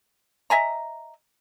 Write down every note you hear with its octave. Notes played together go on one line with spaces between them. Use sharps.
D#5 E5 G#5 A#5